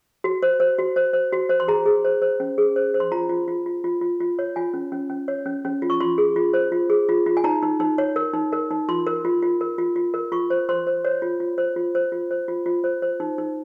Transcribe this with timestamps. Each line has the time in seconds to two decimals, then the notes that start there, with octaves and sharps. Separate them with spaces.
0.24 F#4
0.43 C5
0.60 C5
0.79 F#4
0.96 C5
1.13 C5
1.33 F#4
1.49 C5
1.60 C6
1.68 G#4 A#5
1.86 G#4
2.05 C5
2.22 C5
2.40 C#4
2.58 G#4
2.76 C5
2.94 C5
3.00 C6
3.12 F4 A#5
3.29 F4
3.48 F4
3.66 F4
3.84 F4
4.01 F4
4.20 F4
4.39 C#5
4.56 F4 G#5
4.74 C#4
4.92 C#4
5.10 C#4
5.28 C#5
5.46 C#4
5.65 C#4
5.82 F4
5.90 C#6
6.00 F4 C6
6.18 G#4
6.36 F4
6.54 C5
6.72 F4
6.90 G#4
7.09 F4
7.26 F4
7.37 G#5
7.44 D#4 A#5
7.63 D#4
7.80 D#4
7.98 C#5
8.16 A#4
8.34 D#4
8.52 A#4
8.71 D#4
8.89 F4 C6
9.07 A#4
9.25 F4
9.42 F4
9.61 A#4
9.78 F4
9.96 F4
10.14 A#4
10.32 F4 C#6
10.50 C5
10.69 C5 C6
10.87 C5
11.05 C5 C#5
11.22 F4
11.40 F4
11.58 C5
11.76 F4
11.95 C5
12.12 F4
12.31 C5
12.48 F4
12.66 F4
12.84 C5
13.02 C5
13.20 D#4
13.38 D#4